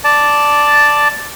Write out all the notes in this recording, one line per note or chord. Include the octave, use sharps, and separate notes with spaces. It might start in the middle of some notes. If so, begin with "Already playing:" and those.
D5 A5